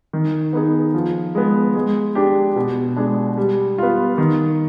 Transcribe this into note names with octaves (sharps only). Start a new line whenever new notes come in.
D#3
B3 D#4 G#4
F3
G#3 B3
G#3
D4 G4
B2
G#3 D4 G#4
G3
B3 F4
D#3